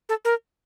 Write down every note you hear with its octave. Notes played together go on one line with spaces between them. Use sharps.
A4
A#4